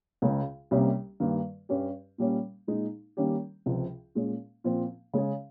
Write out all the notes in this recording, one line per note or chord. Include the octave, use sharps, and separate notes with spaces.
C#2 C#3 G#3
C2 C3 G3 A#3 C#4
G2 D#3 A#3
G2 G3 C#4 G4
A#2 G3 A#3 C#4
A#2 G#3 D#4
D#3 G3 A#3 C#4 G4
C#2 C3 F3
A#2 G#3 C#4
A#2 F3 C4
C#3 G#3 C#4 G#4